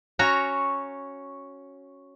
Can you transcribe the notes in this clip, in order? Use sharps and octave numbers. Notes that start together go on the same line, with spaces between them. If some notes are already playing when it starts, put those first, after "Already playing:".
C#4 F#4 C#5 A#5